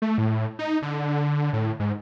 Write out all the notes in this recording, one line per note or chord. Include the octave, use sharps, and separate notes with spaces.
A3
A2
D#4
D3
A2
G#2